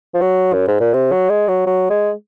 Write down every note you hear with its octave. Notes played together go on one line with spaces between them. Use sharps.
F3
F#3
F#2
G#2
A#2
C3
F#3
G#3
F#3
F#3
G#3